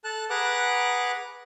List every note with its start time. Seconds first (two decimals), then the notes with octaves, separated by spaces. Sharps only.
0.04 A4 A5 F#6
0.30 G#4 B4 F#5 A#5 D6 F#6